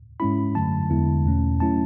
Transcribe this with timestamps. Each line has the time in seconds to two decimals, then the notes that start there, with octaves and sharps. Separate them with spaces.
0.20 G#2 G#3 C#4 E4 B5
0.55 F#2 D3 F#3 A3 A5
0.90 E2 D3 G#3 B3 E4
1.25 E2 B2 A3 C#4
1.60 F#3 A3 C#4 E4 A5